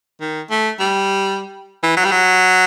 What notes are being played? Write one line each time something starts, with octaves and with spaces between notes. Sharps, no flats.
D#3
A3
G3
E3
F#3
G3
F#3